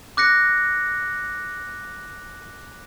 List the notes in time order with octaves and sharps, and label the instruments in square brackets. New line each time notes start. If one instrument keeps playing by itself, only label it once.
[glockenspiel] D6 F#6 A#6 C#7